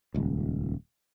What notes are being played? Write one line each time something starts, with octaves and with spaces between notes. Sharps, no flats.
D#1 C#2